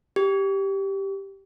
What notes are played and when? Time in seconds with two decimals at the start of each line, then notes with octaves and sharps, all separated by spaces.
0.16 G4